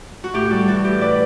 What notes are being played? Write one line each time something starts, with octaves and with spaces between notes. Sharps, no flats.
F#4
A2 G4
G3 F#4 A4
E3 F#4 A4
A2 G4
B4 D5